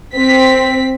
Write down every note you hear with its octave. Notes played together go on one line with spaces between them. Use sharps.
C4 B6